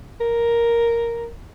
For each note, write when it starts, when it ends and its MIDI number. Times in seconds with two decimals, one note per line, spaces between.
0.21 1.26 70